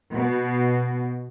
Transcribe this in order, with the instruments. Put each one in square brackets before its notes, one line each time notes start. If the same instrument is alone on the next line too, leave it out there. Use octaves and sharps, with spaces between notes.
[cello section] B2